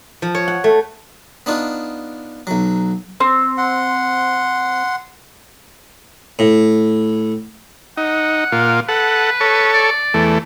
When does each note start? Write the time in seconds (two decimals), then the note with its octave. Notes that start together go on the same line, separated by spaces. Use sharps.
0.22 F3
0.35 C#5
0.48 F#5
0.64 A3
1.46 B3 D4 D#4 F4
2.47 B1 F#3
3.20 C4
3.57 F#5 C6
6.39 A2
7.97 D#4 F#5
8.52 A#2 F4
8.88 A4 B4 F#5
9.40 A4 C#5
9.74 D5
10.14 E2 A3